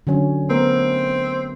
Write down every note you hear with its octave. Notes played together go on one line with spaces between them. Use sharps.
D3 F#3 C#4
A3 B3 C4 A#4